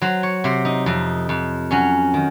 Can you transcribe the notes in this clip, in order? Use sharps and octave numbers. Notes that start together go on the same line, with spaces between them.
F#3 C5
C#5
C3 C5
D#4
F2 D#4
F2
F#3 C#4
D#3